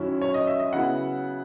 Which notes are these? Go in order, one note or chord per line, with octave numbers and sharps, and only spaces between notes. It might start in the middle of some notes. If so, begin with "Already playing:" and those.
Already playing: F#2 D#3 F#3 C#4 E4
C#5
D#5
E5
D#5
C#3 F#3 B3 E4 F#5